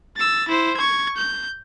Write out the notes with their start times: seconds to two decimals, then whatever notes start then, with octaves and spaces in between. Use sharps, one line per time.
0.16 E6 A6
0.48 E4 C5
0.77 C#6 G#6
1.17 G6